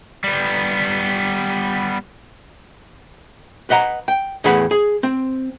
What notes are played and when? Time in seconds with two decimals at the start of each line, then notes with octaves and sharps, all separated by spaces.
0.24 G3 B3
3.70 B4 D#5 F#5 A#5
4.08 G5
4.44 E2 A2 G#4 B4 F#5 B5
4.71 G#4
5.03 C4